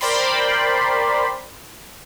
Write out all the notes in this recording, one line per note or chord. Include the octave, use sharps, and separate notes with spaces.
A#4 C5 D5 G5 B5 C6